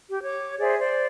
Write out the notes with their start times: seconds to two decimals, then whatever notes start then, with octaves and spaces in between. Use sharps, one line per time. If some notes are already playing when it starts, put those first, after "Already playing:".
0.10 G4
0.23 C#5 D6
0.59 G#4 C5 D5 E5
0.78 C5 D5